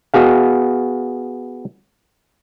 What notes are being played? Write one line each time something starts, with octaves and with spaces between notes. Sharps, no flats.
B3 F#4 G#4 F5